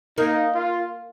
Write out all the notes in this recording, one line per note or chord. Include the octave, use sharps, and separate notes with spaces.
A#3 D#4
F4